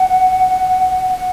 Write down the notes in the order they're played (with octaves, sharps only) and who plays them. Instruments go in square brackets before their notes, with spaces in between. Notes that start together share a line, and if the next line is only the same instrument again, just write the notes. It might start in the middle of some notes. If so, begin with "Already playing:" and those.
Already playing: [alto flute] F#5
F#5